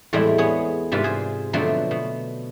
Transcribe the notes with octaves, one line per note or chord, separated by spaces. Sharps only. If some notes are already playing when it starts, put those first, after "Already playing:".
E2 A2 G3 G#3 C4 E4
B3 G#4 C#5
G#2 C3 G3 F4 B4
G#4 C5
B2 D3 F3 F#3 A3 C4
B2